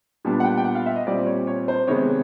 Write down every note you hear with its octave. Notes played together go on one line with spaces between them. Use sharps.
A#2 G3 B3 D4
F#5
G5
G5
F#5
F5
E5
D#5
A#2 G3 C4 D5
C#5
C#5
C5
C3 D#3 G#3 B3 C#5